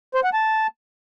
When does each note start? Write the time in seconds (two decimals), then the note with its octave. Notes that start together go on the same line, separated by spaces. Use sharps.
0.14 C5
0.24 F#5
0.33 A5